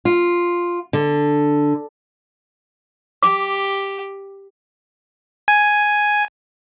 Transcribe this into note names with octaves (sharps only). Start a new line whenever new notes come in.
F4
D3
G4 D6
G#5